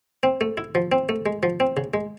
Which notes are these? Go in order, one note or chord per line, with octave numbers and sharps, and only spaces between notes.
C4
A3
E4
F3
C4
A3
G#3
F3
C4
C#3
G#3